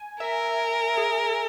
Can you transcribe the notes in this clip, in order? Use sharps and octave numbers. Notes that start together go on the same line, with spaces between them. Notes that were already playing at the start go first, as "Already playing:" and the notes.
Already playing: G#5
A#4 E5
G#4